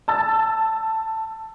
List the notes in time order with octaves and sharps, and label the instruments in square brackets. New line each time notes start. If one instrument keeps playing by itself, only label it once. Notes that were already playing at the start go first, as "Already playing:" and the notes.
[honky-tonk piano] A5 E6 A6